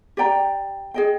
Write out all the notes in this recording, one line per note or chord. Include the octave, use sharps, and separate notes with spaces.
G4 D5 G5 A#5
G#4 D#5 G5